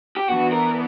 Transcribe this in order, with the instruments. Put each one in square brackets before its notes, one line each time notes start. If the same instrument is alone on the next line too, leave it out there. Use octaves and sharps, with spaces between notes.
[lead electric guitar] G4
[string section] E3 B3 D4 [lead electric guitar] F#4
[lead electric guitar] A#4